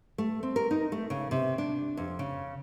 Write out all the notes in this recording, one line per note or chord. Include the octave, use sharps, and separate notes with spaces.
A3
C4
A#4
D#4
A3
C#3
C3
D4
F2
C#3